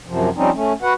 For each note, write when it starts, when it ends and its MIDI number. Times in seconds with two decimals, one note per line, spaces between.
0.07 0.29 42
0.07 0.29 48
0.07 0.29 53
0.36 0.50 53
0.36 0.50 55
0.36 0.50 60
0.36 0.50 61
0.36 0.50 63
0.54 0.73 57
0.54 0.73 61
0.82 0.93 66
0.82 0.93 71
0.82 0.93 78